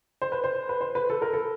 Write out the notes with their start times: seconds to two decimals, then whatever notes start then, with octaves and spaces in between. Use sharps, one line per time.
0.22 C5
0.32 B4
0.44 C5
0.69 B4
0.81 C5
0.95 B4
1.10 A4
1.22 A#4
1.33 A4